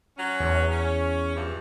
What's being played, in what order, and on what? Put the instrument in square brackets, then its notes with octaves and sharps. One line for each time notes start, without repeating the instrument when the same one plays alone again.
[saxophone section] F#3 C#4
[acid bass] E2
[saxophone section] C#4
G2 E3 F3